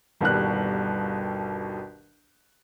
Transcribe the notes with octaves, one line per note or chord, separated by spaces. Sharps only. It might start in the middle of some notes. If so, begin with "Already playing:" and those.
G1 D#2 B2 G3 F#6